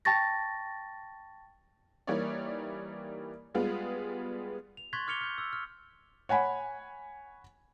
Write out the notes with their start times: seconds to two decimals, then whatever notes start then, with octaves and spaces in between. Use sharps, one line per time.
0.05 G5 A5 C#6 A6 A#6
2.07 E3 G3 A#3 D#4 C#5 D5
3.55 G3 G#3 B3 F4 G#4
4.77 F7
4.93 C6 C#6 F#6 G#6 A6 B6
5.07 D6 F6 G#6 C#7 F7 G7
5.21 F6 G6
5.38 E6
5.53 F6
6.29 C#5 F#5 G#5 B5